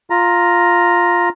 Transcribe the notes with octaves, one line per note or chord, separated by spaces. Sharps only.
F4 A#5